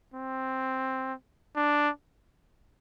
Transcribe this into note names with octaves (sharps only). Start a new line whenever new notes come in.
C4
D4